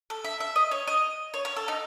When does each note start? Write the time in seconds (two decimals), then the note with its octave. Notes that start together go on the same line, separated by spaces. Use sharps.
0.10 A4
0.25 E5
0.40 E5
0.56 D#5
0.71 C#5
0.87 D#5
1.34 C#5
1.45 C#5
1.56 A4
1.68 D#4